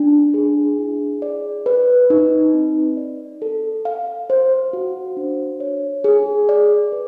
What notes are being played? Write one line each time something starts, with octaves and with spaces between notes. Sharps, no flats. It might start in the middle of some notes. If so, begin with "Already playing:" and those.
Already playing: D4
G#4
E4
D5
B4
D#4
C4
D5
A4
F5
C5
F#4
D4
C#5
G#4
D5
B4